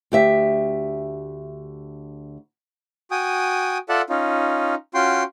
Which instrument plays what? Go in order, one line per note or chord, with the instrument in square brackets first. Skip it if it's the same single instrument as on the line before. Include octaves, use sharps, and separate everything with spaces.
[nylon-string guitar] D2 G4 E5
[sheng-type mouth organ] F#4 G5 G#5 D#6
F4 A4 D5 E5 F#5
C#4 D#4 F4
C#4 F4 F#4 G5 C6